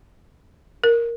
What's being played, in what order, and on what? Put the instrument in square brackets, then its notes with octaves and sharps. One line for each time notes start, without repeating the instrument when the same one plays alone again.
[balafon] A#4